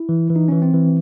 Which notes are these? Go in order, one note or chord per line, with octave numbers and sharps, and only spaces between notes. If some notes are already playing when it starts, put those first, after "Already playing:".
Already playing: E4
E3
E3
D#4
E3 C#4
C4
E3